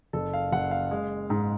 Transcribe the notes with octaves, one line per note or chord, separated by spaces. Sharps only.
F#1 A4
F5
F#1 F#5
F5
G#3
G#2